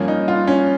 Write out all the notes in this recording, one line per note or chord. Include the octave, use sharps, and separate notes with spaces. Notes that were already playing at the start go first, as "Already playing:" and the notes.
Already playing: G2 F3 A#3 C#4
D#4
F4
C#4